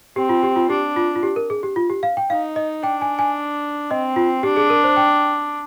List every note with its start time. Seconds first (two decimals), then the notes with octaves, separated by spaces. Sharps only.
0.16 C4 G4
0.29 F4
0.43 G4
0.56 F4
0.69 D4 G4
0.96 F4
1.16 F4
1.23 G4
1.36 A#4
1.50 G#4
1.63 G4
1.76 F4
1.90 G4
2.03 F5
2.17 G5
2.30 D#4 F5
2.56 D#5
2.83 D4 G5
3.01 G#5
3.19 G#5
3.90 C4 D#5
4.16 F4
4.43 D4 G4
4.57 G#4
4.70 A#4
4.84 C5
4.97 G5